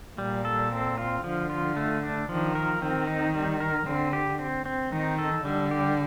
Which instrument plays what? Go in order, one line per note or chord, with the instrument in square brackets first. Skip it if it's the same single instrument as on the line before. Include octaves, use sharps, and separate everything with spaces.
[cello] A#2 [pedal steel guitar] G3
[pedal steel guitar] A4
C4
F4
[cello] D3 [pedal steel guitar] F3
[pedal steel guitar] F4
A3
D4
[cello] D#3 [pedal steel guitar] F3
[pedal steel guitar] A#4
[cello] D#3 [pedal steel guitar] C4
[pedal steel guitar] D#4
G3
A#4
[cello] D3 [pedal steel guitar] C4
[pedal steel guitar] G4
C4
C4
[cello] D#3 [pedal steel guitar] D#4
[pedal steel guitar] A4
[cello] D3 [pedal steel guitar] G3
[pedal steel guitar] G4